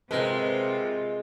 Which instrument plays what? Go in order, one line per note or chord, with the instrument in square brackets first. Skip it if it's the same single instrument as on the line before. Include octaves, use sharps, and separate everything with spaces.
[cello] C3 F4 [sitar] G#3 [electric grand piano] C4 A#4 B4